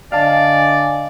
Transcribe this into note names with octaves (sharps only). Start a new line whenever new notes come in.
D3 D5 D#5 F5 G#5 A5